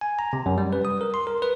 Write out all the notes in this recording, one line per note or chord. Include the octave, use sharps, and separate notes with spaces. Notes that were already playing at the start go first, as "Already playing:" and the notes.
G#5
A#5
C3
F#2
G3
B4
D#6
A#4
C6
A#4
B4